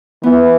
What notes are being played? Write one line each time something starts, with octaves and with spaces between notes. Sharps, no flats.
E3 B3